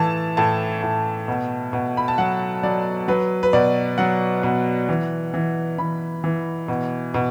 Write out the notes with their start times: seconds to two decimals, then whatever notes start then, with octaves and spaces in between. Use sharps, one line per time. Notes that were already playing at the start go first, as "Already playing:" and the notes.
Already playing: A2 E3 A5
0.37 A2 A5
0.82 A2
1.28 B2
1.73 B2
1.97 B5
2.08 A5
2.18 F#3 F#5
2.63 F#3 D5
3.08 F#3 B4
3.43 B4
3.53 B2 D5
3.98 F#3 F#5
4.43 B2
4.89 E3
5.34 E3
5.78 E3 B5
6.24 E3
6.68 B2
7.14 B2